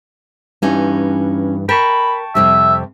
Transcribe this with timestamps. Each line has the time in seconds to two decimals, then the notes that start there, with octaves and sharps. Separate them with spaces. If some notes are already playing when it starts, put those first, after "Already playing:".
0.62 G2 E3 B3 C#4 D#4
1.69 A#4 G5 A5 B5 C#6
2.35 F2 C3 G3 E5